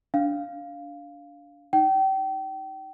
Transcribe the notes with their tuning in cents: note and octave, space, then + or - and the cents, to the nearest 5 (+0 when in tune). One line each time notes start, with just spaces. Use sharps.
D4 -20 F5 +0
D#4 +0 G5 -30